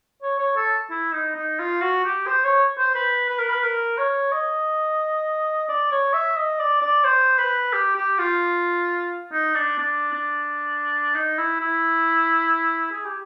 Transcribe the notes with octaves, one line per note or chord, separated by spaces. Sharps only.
C#5
C#5
A4
E4
D#4
D#4
F4
F#4
G4
C5
C#5
C5
B4
B4
A#4
B4
A#4
C#5
D#5
D5
C#5
E5
D#5
D5
D5
C5
B4
G4
G4
F4
D#4
D4
D4
D4
D#4
E4
E4
G#4
G4